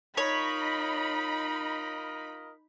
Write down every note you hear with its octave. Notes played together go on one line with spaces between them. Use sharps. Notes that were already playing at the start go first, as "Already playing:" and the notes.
D#4 F4 A#4 C#5 D#5 B5